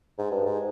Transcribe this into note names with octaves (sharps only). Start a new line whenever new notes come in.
G#2
G2
G#2